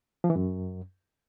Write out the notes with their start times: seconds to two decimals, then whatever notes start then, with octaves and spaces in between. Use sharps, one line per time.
0.24 F3
0.30 E3
0.36 F#2